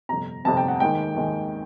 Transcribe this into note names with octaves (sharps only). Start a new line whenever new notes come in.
G1 F2 C3 A#5
G1 F2 C3 A5
G5
F#5
D#2 D#3 G#3 G5
D#2 D#3 G#3